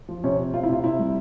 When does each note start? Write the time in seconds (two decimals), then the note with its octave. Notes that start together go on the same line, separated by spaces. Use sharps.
0.09 F3
0.24 C3 C#4
0.39 C3
0.54 C3 F4
0.63 E4
0.69 C3 F4
0.84 C3 E4
0.99 G3